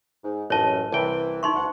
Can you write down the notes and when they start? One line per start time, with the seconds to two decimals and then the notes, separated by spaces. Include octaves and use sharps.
0.23 G#2
0.50 A1 F#2 C#5 D#5 A5
0.93 C2 C3 E3 G5
1.43 D#4 E4 C6 C#6
1.55 D2 F#5